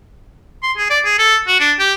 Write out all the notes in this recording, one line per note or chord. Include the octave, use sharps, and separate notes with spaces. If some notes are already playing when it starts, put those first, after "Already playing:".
C6
G#4
D5
G#4
A4
F#4
D4
G4